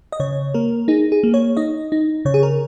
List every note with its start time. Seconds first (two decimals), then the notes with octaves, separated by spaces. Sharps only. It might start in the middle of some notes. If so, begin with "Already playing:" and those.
0.12 D#5
0.20 C#3 C#5
0.54 A#3 A#4
0.88 D#4 G#4
1.12 G#4
1.23 A#3
1.34 C#5
1.57 D#4 D#5
1.92 D#4
2.25 C#3 C#5
2.34 G#4
2.43 A#4